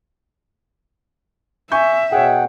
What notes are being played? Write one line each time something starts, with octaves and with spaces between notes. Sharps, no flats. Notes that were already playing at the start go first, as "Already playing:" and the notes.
E5 G#5 C#6 G6
B2 G#4 C#5 F#5 G5